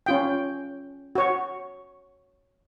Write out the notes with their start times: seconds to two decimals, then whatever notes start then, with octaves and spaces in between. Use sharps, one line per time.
0.06 C#4 F4 G5
1.15 F#4 C#5